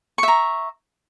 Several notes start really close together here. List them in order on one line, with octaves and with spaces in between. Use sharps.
C#6 E5 A#5